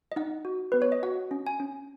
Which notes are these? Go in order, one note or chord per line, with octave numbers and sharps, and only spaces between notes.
D#5
D#4 F#5
F#4
B3 B4
C#5
D#5
F#4 F#5
C#4
G#5
C#4